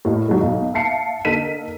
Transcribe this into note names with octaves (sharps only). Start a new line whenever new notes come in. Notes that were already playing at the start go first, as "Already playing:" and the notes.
A2 A#3 D#5
D#3 F#3 G#3
B1 D#4
E5 F5 A5 C7 C#7
D3 A#3 D#4 A4 B6 D#7